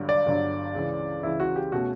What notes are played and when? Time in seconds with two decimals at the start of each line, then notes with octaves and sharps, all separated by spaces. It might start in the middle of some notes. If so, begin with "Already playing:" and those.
Already playing: G1 G2 D3 F#3
0.09 D5
0.26 G1 G2 D3 F#3
0.74 C#2 C#3 E3
1.23 C#2 C#3 E3 E4
1.40 F#4
1.56 G4
1.72 B2 A3 C#4 F#4